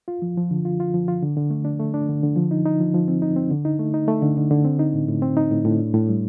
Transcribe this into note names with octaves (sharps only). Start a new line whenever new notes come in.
F4
F3
F3
D3
F4
F4
F3
F4
D3
D3
A3
D4
A3
D4
D3
D3
F3
D#4
D#4
F3
F3
C4
D#4
C4
D3
D#4
A3
D#4
A3
D3
D3
D3
C4
D#4
A2
A2
C4
D#4
A2
A2
D4
A2
G3